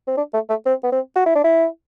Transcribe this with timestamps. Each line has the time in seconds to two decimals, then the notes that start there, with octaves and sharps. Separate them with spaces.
0.08 C4
0.17 D4
0.34 A3
0.49 A3
0.66 C4
0.84 B3
0.92 C4
1.16 F#4
1.26 E4
1.35 D4
1.44 E4